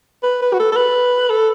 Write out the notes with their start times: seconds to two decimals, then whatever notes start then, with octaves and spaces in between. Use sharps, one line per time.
0.23 B4
0.42 B4
0.53 F#4
0.60 A4
0.72 A4
0.77 B4
1.30 A4